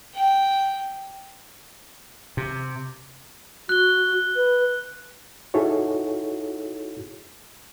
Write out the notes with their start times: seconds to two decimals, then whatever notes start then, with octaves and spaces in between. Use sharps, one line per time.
0.14 G5
2.37 C3
3.69 F#4 F#6 G7
4.36 B4
5.54 D#4 E4 F#4 G#4 A4 C#5